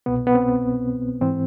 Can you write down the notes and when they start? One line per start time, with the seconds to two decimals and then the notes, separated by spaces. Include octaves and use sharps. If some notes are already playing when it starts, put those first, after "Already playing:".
0.06 C2 B2 B3
0.27 B3
0.35 C4
1.21 G#2 E3 C4